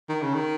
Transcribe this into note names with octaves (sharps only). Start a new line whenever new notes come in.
D#3
C#3
D#3